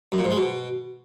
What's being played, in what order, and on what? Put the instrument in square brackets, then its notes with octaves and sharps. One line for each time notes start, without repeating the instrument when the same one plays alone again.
[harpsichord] F#2
A#2
G#2
G#3
B2